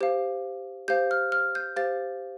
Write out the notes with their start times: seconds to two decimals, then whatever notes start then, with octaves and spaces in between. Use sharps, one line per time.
0.01 G4 C5 F5
0.88 G4 C5 F5 G6
1.11 F6
1.32 F6
1.55 G6
1.76 G4 C5 F5 A6